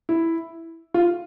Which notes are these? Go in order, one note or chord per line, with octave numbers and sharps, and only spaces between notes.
E4
F4